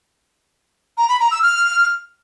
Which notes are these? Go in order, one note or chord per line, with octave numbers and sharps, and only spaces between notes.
A#5
B5
A#5
E6
F6